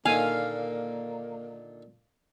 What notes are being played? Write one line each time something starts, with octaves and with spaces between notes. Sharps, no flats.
A#2 D3 D#3 A#3 F5 G#5